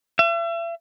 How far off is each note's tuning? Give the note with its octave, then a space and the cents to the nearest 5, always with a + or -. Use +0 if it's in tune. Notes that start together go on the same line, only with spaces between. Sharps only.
E5 +40